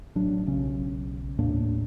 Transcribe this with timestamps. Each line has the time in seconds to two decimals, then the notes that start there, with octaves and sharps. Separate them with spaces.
0.15 A1 F#3 D4
0.47 B1 C#3 C#4
1.38 D#2 A2 A#3 D4